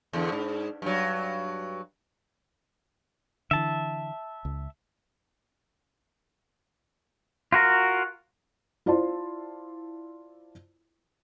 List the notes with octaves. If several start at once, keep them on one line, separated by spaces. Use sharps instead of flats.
E2 D3
G#2
G2 F#3
D3 E3 E5 A5
C#2
F4 F#4 A#4
E4 F4 C5 D5 A5 C6